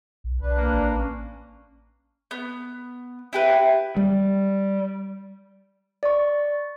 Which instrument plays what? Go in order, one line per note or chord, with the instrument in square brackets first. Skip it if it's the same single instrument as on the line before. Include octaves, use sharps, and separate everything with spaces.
[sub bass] B1
[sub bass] B1 [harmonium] D4 B4
[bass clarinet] A#3
[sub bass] A1
[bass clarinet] C#4
[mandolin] B3
E4 G4 B4
[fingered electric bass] G3
[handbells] D5 C#6